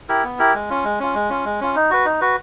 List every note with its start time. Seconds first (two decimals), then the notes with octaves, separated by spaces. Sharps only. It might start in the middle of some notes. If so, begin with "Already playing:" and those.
0.09 E4 G4 A#4
0.24 B3
0.39 E4 G4 A#4
0.54 G#3
0.69 C#4 F4
0.84 G#3
1.00 C#4 F4
1.15 G#3
1.30 C#4 F4
1.45 G#3
1.61 C#4 F4
1.76 D#4
1.91 F#4 B4
2.05 D#4
2.21 F#4 B4